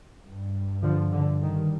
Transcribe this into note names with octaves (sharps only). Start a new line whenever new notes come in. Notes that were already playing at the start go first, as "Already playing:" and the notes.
G2
D3 F3
D3
D#3